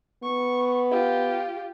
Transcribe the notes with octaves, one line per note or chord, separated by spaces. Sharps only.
B3 C#6
F4 G4